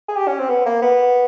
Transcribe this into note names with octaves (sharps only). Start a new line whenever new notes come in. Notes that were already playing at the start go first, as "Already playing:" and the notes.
G#4
G4
C#4
C4
B3
A#3
B3